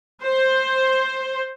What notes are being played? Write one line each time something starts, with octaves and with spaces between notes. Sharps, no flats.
C5